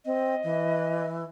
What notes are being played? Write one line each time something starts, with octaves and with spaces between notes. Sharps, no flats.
C4 D#5
E3